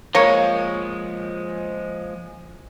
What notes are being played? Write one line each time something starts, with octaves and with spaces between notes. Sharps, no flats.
F3 G#3 A#3 C#5